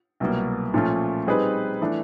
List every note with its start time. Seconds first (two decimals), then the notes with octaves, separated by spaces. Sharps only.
0.20 C2 B2 F#3 A#3
0.74 A#2 F3 A3 C#4 F4
1.26 G3 C4 D#4 G#4 B4
1.82 E3 A3 D4